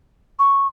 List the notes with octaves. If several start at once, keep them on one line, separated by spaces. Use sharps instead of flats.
C#6